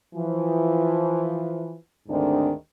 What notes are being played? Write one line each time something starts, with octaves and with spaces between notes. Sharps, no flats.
E3 F3
D2 G#2 D#3 C4 D4